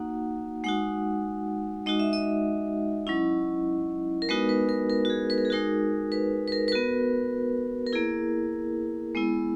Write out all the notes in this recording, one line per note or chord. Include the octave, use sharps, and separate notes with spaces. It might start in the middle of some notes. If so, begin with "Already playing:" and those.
Already playing: A#3 D#4 F#4 F#5
G#3 D#4 F#4 F#5
G#3 D#4 F#4 D#5
E5
D#5
F#3 C#4 E4
A#4
G#3 B3 D#4 F#4 B4
B4
A#4
A#4
F#4
G#4
B4
A#4
G#4
G#3 D#4 F#4 A#4
B4
B4
A#4
B4
B3 F#4 A#4
A#4
A#3 E4 G#4
G#3 B3 E4